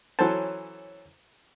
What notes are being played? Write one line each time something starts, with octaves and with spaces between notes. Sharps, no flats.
E3 F#3 C#4 A4 C5 A5